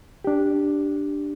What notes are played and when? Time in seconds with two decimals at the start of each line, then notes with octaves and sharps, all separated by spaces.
0.25 D4 G4